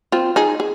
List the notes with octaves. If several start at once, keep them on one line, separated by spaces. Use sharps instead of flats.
C4 F4
D#4 G#4
G#4